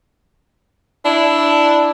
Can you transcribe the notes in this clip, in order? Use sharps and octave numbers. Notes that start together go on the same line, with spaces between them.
D4 E4